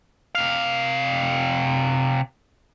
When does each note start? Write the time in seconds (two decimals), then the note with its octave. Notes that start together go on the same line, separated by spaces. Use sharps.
0.35 C3 F5